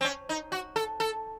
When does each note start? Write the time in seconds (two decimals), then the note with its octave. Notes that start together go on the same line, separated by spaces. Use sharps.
0.01 C4
0.04 C#4
0.29 D#4
0.52 F#4
0.76 A4
1.00 A4